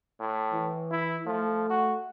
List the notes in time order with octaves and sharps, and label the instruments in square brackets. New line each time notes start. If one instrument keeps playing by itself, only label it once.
[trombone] A2
[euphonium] E3
[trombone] E4
[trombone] F3 [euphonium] A3
[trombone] F#4